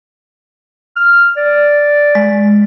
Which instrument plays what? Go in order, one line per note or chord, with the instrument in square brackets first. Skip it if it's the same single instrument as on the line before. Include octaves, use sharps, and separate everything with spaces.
[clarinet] F6
D5
[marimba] G#3